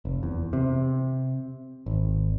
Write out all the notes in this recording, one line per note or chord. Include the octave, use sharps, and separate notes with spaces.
F1
E2
C3
G#1